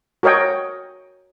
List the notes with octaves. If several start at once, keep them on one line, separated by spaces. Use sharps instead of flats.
F#4 A#4 C#5 D#5 G5